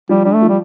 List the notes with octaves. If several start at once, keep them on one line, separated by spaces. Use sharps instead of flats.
F3 G3
G3 D4
A3
F3
G3